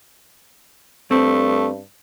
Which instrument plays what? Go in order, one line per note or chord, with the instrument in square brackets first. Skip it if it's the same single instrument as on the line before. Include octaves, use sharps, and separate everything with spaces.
[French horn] G2 [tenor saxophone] A3 [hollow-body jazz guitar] C4